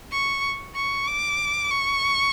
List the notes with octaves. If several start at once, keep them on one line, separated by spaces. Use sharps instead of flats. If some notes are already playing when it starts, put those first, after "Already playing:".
C#6
C#6
D6
C#6